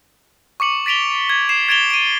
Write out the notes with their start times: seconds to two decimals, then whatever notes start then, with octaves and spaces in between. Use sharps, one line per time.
0.60 C#6 D6 C#7 F#7
0.86 A6 B6 D7 F7 G7
1.30 G#6
1.49 C7 E7
1.69 G#6 A6 D7 E7 F7 G7
1.91 D7 D#7